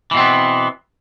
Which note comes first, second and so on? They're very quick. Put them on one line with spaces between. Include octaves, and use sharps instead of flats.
E3 B2 C4 B3